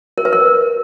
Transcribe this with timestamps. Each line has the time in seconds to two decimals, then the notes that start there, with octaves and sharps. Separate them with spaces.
0.18 A#4
0.25 B4
0.33 A#4